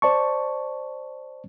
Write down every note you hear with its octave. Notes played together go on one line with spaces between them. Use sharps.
C5 D5 A5 C#6